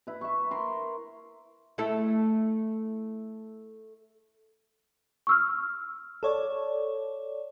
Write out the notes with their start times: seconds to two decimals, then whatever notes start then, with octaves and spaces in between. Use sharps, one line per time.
0.07 E4 B4
0.21 E5 C#6
0.51 A#4 C6
1.78 A3 E4 A4
5.27 C#6 E6 F6
6.23 A4 C#5 D5